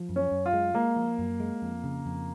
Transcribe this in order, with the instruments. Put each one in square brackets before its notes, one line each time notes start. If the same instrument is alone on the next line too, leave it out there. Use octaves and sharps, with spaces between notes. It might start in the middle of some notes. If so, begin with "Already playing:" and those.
Already playing: [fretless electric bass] F3
F#2
[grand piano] C#4
[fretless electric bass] F#2
[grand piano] F4
[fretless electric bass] G#3
[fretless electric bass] G#3 [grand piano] A#3
[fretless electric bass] F3
F#2
G#3
F2
C#3
F2